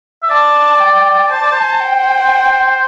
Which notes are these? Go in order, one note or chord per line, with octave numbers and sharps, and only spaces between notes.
E5
D5 A5
G5
C5 A5
D5
C5
G5